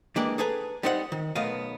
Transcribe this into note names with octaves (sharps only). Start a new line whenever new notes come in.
E3 G#3 A#3 D4 G4 D5
G#4 A4 B4 G#5 A#5
G3 C4 D#4 C5 D5 F#5
D#3
B1 A3 B3 A#4 D#5 F5